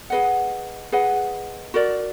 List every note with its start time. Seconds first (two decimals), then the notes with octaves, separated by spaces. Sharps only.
0.10 G#4 B4 D#5 F#5
0.92 G#4 B4 D#5 F#5
1.74 F#4 A#4 D5